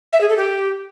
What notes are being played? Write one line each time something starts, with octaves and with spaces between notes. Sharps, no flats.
E5
G#4
A4
G4